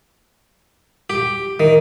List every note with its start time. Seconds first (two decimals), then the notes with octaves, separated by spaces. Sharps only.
1.10 G4
1.60 D#3